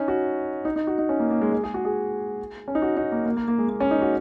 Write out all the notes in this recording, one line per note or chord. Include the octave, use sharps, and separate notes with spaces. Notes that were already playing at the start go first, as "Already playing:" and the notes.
Already playing: C#4 D#4
F#4
D#4
D#4
F#4
D#4
C#4
A#3
A#3
G#3
G#3
G#4
F#4
G#4
C#4
D#4
F#4
D#4
A#3
A#3
A#3
A#3
G#3
A#3
C#4
D#4
F#4